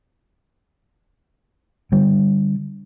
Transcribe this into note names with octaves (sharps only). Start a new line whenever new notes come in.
D3 G3